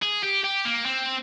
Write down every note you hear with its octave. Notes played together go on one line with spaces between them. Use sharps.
G#4
G4
G4
A#3
C4